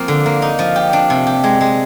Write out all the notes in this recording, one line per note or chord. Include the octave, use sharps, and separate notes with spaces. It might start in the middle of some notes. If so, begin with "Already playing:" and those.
Already playing: F3 A#3 C4
D3
A#3
D#4
F3
G4
D4
C3
G4
G#3
G#3